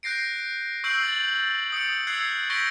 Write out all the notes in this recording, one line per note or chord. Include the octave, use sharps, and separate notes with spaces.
F#6 G6 A#6 C7 D7
C#6 E6 G6 C7 D7 F#7
A6 F#7
D#6 C#7 D7
E6 F#6 G#6 A6 C7 C#7
C#6 G6 A#6 B6 D7 G7